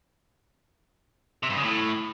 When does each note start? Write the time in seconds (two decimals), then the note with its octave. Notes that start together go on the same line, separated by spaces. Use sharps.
1.43 C3
1.50 G2
1.57 C#3
1.63 A2